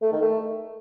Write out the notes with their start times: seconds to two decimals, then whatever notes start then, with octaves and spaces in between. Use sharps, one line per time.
0.02 A3
0.12 D#3
0.22 A3